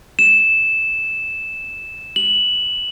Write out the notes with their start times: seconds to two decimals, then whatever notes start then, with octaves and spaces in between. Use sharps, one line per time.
0.19 E7
2.16 F#7